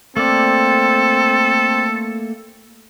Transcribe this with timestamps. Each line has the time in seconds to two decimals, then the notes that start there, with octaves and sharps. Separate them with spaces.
0.17 A3 A#3 C4 A4 D5